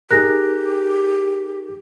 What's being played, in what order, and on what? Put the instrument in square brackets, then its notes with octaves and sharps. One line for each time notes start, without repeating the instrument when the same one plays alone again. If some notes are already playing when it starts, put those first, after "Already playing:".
[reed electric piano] D#4 G#4 A#4 [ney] G4 [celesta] F#6 A#6